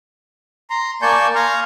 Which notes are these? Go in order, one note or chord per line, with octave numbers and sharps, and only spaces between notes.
A#5 C6
A#3 D5 G#5 A5 C#6 G6
F5 G#5 A#5 C6 F6